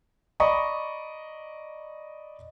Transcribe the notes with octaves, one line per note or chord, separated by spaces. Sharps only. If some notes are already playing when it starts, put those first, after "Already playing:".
D5 D#5 A#5 B5 C#6 D#6